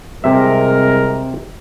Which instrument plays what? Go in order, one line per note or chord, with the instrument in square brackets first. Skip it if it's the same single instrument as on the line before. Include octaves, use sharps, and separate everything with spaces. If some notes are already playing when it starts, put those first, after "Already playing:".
[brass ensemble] C2 G#3 A#4 [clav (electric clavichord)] C3 E5